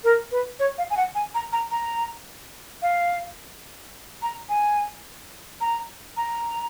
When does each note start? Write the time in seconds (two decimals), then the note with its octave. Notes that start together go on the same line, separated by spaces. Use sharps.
0.04 A#4
0.32 B4
0.60 C#5
0.78 F5
0.90 G#5
0.97 F#5
1.15 G#5
1.35 A#5
1.53 A#5
1.71 A#5
2.82 F5
4.22 A#5
4.49 G#5
5.61 A#5
6.17 A#5